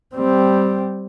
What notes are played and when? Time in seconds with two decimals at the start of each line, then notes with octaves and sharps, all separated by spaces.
0.15 G3 C4